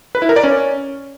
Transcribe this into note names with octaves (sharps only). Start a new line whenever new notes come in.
B4
E4
A#4
D5
C#4